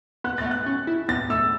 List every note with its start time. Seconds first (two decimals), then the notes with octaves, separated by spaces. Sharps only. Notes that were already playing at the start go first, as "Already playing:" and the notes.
0.24 B3 F#6
0.38 A3 A6
0.46 B3
0.51 F#6
0.66 C#4
0.87 E4
1.08 B3 A6
1.30 A3 E6